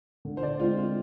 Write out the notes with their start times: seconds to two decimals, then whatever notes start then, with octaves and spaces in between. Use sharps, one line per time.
0.25 D3
0.37 C5
0.43 D5
0.59 G#3 C4 F4
0.77 F4